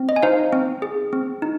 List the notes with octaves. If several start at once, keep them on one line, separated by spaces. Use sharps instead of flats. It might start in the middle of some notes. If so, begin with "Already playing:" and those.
Already playing: C4
D#5
G#5
D#4 C5 F5
C4
G#4
C4
D#4